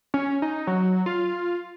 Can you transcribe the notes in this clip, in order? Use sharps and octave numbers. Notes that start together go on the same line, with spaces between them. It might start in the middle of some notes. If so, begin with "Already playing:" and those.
C#4
D#4
F#3
F4